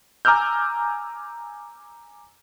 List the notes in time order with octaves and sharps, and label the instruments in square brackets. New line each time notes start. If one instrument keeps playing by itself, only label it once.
[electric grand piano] G#5 A#5 D6 E6 F6 G6